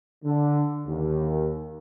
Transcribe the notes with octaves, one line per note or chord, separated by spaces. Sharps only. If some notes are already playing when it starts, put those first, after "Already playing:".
D3
D#2